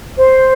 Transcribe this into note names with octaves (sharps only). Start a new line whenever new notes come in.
C5